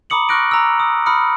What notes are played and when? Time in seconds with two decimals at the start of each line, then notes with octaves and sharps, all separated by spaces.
0.10 A#5 B5 D6 D#6 C#7 F#7
0.29 C#6 F6 F#6 A#6 D7
0.51 A#5 E6
0.80 D#6
1.06 B5 D#6 F6 C#7